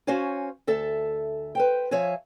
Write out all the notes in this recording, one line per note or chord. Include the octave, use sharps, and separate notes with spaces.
C#4 F#4 C5 C#5 F5 G#5
D2 A4 E5 A5
B4 C5 G5
F3 C#5 E5 F5 G#5